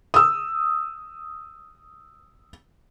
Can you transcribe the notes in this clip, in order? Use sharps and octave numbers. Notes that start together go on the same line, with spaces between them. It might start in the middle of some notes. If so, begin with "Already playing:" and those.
D#6 E6